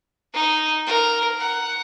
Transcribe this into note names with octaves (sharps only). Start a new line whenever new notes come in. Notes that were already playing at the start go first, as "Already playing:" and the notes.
D#4
A#4
F#5